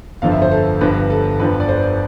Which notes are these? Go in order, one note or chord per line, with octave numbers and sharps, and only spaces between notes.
G1 F2 D3 F3 F5
E5
C5
A4
G1 G2 F3 B4
A4
G1 F2 D3 F3 B4
D5
C5
D5